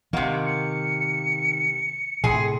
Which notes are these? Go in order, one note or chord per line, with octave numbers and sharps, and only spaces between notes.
C3 D#3 A#3 F#5
C#7
A2 C3 G#4